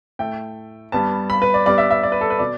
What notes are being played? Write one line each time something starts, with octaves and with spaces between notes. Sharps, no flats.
A2 A3 G5
G2 G3 B3 A5
B5
B4
D5
G2 G3 B3 D5
E5
E5
D5
B4
A4
B4
B2 D5